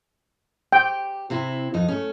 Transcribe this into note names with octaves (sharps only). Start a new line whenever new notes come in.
G4 G5
C3 C4 E4
F2 D#4 D#5
A3 C#4